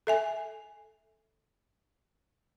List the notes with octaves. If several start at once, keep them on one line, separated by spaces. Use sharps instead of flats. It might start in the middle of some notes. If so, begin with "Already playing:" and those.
A4 E5 G#5